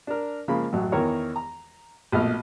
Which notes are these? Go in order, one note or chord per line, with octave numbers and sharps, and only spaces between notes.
D4 A#4
C#3 F3 G#3 A#3 B5
A1 F#2 F#3
E2 D#3 E3 A#4 C#5 C#6
A#5
A#1 B2 A3 D#5 F6